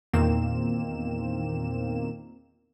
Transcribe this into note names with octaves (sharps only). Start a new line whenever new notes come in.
E2 A#2 D#3 A#3 C4 E7